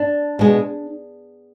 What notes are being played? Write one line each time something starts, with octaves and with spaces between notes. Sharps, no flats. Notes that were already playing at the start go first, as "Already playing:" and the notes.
Already playing: D4
B2 G#3 B3